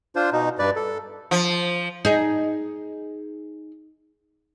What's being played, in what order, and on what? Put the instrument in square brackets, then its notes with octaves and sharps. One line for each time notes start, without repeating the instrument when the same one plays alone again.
[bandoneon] D4 F4 C5
B2 D#4
G2 B4 D5
A4
[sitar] F3
[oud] D#4 G#4